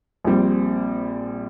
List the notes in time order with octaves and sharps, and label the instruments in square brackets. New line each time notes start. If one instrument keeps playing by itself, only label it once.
[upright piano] A#1 A#2 G3 C4